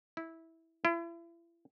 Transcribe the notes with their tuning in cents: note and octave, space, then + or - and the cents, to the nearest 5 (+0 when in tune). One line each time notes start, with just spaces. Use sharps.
E4 -15
E4 +35